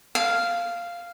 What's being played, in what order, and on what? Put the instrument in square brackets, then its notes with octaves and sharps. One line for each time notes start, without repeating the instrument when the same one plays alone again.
[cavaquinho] F5